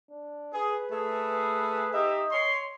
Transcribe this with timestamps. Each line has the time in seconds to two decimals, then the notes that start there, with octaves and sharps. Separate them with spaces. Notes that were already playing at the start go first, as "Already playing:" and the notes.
0.10 D4
0.54 G#4 B4
0.91 A3 G#4
1.93 D#4 G4 D#5 E5
2.32 C#5 C6